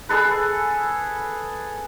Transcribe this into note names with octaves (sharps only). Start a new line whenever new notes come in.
G#4 A4 B4